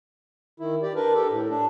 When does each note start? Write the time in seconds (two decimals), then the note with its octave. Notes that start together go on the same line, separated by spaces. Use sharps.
0.60 D#3 E4
0.82 G4 D5
0.96 D4 A#4 B4
1.14 G4 A4
1.30 A2
1.50 D4